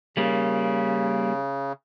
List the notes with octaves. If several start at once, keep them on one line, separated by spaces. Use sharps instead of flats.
C#3 G3 A#3